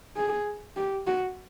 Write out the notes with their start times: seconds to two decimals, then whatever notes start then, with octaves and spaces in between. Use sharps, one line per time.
0.16 G#4
0.76 G4
1.07 F#4